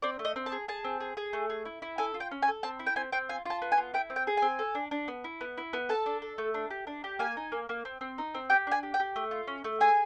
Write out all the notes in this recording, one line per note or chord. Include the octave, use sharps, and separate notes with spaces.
C4 D5
A3
D#5
C4
A5
G#4
G#4 A5
C4
G#4
G#4
A3
G#4
E4
E4
A4 G#5
F4
G5
C#4
G#5
A4
C4 A5
E4
G5
C4 G#5
C4 G5
F4 G#5
F4 A5
B3
G#5
F4
E4 G5
C4
G5
G#4
C4 G#5
A4
D4
D4
B3
E4
B3
E4
B3
A4 A5
D4
A4
A3
D4
G4
D4
G4
A#3 G#5
D#4
A#3
A#3
C4
C4
D#4
C4
G4 G5
D4 G#5
G4
G5
G4
A3
F4
C#4
A3
G#4 G#5